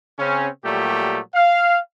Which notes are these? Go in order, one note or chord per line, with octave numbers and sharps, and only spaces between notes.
C#3 C4 C#4
A#2 F#3 G3 A3 G4
F5